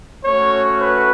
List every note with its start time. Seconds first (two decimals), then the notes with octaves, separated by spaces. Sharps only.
0.24 A3 C#4 F#4 C#5
0.81 B4